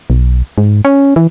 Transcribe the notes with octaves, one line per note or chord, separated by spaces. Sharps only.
B1
G#2
C#4
E3